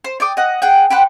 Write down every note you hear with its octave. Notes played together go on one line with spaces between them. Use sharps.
C5
D5 G5 D6 D#6
D#5 F#5
G#4 F#5 G5
G4 B4 C5 F#5